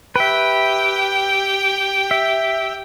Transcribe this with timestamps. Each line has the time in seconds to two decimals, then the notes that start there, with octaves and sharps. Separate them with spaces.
0.16 G4 B4 E5 G5
2.11 E5